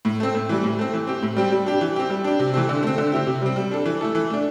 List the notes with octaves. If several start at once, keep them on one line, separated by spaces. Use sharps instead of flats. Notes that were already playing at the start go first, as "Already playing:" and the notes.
A2
A3 C4
A2
E3 G3
A2
A3 C4
E3
C4 G4
A2
G3 C4 G4
G3
D4 G4
E3
C4 G4
G3
D4 G4
C3
E3 A3 C4
D3
A3 C4
D3
C4 E4 G4
C3
G3 C4
G3
D4 A4
E3
A3 E4 A4
E3
A3 D4